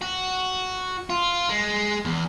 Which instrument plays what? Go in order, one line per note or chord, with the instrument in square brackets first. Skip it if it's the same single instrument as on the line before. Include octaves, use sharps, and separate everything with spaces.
[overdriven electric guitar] F#4
F4
G#3
E2